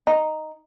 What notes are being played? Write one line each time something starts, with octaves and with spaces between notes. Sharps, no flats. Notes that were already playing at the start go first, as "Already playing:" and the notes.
D#4